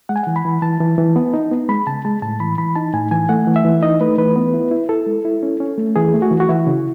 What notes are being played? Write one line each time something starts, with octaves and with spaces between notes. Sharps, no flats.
G#3 F#5
G#5
E3 F#5
B5
E3
E3 A5
E3
E3
B3
D#4
B3
G#3 B5
C#3 A5
G#3 A5
A2 A5
E3 B5
E3 B5
D#4 A5
A2 G#5
E3 G#5
A3 F#5
E3
E5
E3
D#4 D#5
A3 B4
E3 B4
B3
E4
E4
E4 A4
G#3
E4
C#4
C#4
A3
E3 G#4
A3
F#4
E3
F#4
E3 E4
C#3